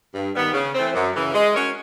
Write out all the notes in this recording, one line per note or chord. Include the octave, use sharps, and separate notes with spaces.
G2
D#3 G3 B3
C#3
E3 A3 C4
F#2
C#3 E3
G#3
C#4 F#4 A#4 C#5